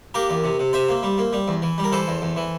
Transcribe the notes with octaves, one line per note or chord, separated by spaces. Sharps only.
A#3 G4 A#4
E2
C3
C3
C3 C5 E5
A#3
G3
A#3
G3
E2
E3
G3
A#4
E3 A4 C5
E2
E2
E3